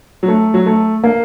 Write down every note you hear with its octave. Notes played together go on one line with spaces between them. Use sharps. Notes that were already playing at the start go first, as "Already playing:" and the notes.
F#3
A3
F#3
A3
A#3